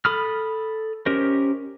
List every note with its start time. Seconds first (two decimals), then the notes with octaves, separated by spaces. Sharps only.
0.05 A4 B5 D#6 F6
1.06 C#4 G4 A#4 C5 D#5